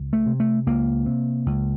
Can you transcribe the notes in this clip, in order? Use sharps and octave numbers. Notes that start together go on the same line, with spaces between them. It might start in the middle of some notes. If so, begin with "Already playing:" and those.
Already playing: C#2
A3
C3
A3
C#2 A#3
C3
C#2